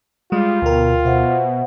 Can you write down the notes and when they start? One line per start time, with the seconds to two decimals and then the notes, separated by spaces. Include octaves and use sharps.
0.32 G3 G#3 F4
0.62 D2 B2 A#4 G5
1.05 B2 C5 E5 F#5